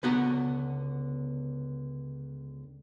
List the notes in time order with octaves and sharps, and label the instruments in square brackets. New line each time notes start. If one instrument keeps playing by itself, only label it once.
[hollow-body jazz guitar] C#2 D3 B3 F#4 F#5 A#5